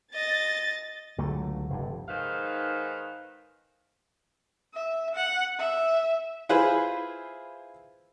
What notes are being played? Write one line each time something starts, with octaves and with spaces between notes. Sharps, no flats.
D#5 A6
C#2 D3 F#3 A3
F1 G2
G#2 D#3 B4 C5 F5
E5
F#5
E5
E4 F4 G#4 B4 C5 B5